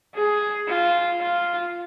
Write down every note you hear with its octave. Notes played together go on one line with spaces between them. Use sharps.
G#4
F4
F4